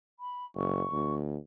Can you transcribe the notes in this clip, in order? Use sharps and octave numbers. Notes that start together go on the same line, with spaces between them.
B5
F#1 C#6
D2